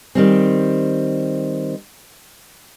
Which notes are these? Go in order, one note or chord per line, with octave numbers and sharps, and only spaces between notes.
D#3 G3 C4